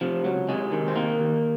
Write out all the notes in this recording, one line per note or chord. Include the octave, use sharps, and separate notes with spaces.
C3 F3
C#2 F#3
C3 G#3
D#3
C4
D#3 A#3
D#2